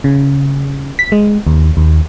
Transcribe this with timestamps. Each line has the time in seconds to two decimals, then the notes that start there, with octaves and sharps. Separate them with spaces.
0.04 C#3
0.99 B6
1.12 G#3
1.47 D#2
1.77 D#2